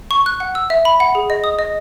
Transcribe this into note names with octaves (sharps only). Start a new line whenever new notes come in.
C#6
F#6
F#5
E6
E5
B5
F#5
G#4
D#5
D#6
D#5